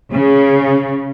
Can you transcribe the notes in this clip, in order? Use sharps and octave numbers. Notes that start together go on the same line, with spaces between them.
C#3